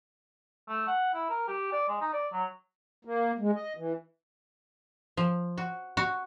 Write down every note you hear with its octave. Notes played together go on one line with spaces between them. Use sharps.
A3
F#5
E4
A#4
G4
D5
G#3
D#4
D5
F#3
A#3
G#3
D#5
E3
F3
F#4
F#4